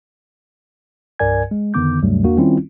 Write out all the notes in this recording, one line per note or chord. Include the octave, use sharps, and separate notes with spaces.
C2 G2 A#4 D5 G#5 G#6
G#3
F2 D3 D#3 B3 D6 G6
D2 G2 C3 F#3 G3 A3
E2 A#3 D4 F#4
D#3 G3 C4 C#4 E4 F4